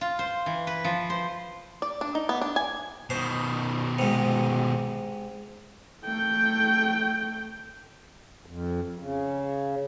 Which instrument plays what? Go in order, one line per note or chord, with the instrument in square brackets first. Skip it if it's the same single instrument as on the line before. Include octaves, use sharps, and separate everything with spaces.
[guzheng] F4
C5
E3
B4
F3
C5
[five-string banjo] D5
D4
D#4
B3
D4
G#5
[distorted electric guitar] B2 D#3 [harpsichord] C5
[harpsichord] G#2 C3
[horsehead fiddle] A3 G5
[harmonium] F2
C#3